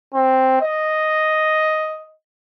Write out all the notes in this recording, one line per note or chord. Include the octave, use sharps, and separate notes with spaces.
C4
D#5